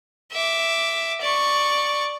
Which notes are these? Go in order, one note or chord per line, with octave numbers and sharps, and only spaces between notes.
E5 D6
D5 C#6